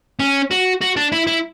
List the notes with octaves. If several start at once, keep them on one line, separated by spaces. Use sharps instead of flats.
C#4
F#4
F#4
D4
E4
E4